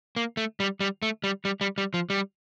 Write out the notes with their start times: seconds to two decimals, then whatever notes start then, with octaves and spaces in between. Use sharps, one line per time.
0.16 A#3
0.37 A3
0.60 G3
0.80 G3
1.02 A3
1.24 G3
1.45 G3
1.61 G3
1.78 G3
1.94 F3
2.10 G3